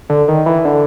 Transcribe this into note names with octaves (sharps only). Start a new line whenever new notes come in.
D3
D#3
E3
D3